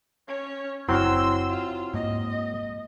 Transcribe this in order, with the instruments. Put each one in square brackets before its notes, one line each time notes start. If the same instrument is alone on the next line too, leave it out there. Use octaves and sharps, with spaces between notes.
[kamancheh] C#4 C#5
[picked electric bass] F#1 [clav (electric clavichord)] F#3 C4 [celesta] E4 F6 [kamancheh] C6 E6
[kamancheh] F4
[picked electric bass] G#2 A#3 [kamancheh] D#5